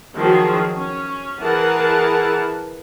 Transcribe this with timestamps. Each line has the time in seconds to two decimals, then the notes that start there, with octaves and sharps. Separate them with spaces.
0.15 D#3 F3 F#3 G#4
0.76 C#4
1.41 E3 G#4 A#4 F#5 A5